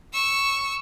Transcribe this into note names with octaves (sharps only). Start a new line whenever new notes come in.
C#6 E6